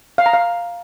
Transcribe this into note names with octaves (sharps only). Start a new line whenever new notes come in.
F5
A#5
F5